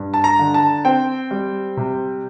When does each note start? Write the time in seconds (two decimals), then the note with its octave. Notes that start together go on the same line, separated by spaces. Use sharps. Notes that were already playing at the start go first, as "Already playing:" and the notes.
Already playing: G2
0.14 A5
0.24 A#5
0.39 D3
0.54 A5
0.85 C4 G5
1.31 G3
1.77 C3